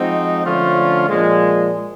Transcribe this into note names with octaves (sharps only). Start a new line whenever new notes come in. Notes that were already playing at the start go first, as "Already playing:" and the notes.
Already playing: F3 G#3 C4 D#4 F#4
D3 F3 A3 C#4 F4
A#2 F3 G#3